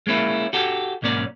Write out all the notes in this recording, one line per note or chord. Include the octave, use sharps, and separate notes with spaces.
G#3 A#3 C#4 E4
F#4 G4 A4
B1 G#2 A#3 C#4 D5